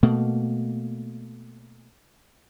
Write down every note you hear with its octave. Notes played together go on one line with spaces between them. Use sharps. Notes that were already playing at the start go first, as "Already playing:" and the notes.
B2 A3 A#3